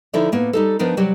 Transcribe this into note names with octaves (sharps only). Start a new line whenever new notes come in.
D3 F3 D#4 E4 A4 D5
A2 A#3 B3
G3 D#4 A4
F3 B3 D4 D#4 A#4
C3 F#3 G3 G4